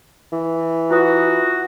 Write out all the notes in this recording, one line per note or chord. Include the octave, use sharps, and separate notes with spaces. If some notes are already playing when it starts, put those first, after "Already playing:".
E3
F4 F#4 B4 D#6